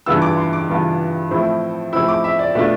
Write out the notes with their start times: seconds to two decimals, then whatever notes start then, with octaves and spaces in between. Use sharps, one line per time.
0.06 G2 E3 B3 F4 E6
0.22 D6
0.37 C6
0.53 D6
0.68 G2 E3 B3 F4
1.31 A2 F3 C4 E4
1.93 A2 F3 C4 E4 E6
2.08 D6
2.24 E5
2.39 D5
2.55 B2 A3 D4 F4 E5